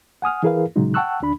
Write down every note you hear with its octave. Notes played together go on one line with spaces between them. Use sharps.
F#5 G#5 D#6 F6
E3 E4 G#4 A#4 B4 F5
A#2 C#3 F#3 G#3 D#4
F#5 G5 A5 C#6 E6 F#6
D2 D4 B5